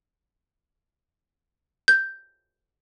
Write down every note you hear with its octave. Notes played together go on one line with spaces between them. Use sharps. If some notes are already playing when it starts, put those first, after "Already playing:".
G6